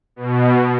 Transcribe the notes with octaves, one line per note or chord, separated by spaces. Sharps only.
B2